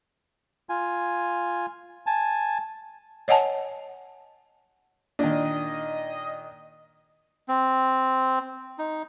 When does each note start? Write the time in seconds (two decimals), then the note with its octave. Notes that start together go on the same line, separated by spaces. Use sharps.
0.69 F4 G#5
2.07 G#5 A5
3.28 C#5 D#5 F#5 G#5 A5
5.19 A#2 D#3 D4 D#5
7.49 C4
8.79 D#4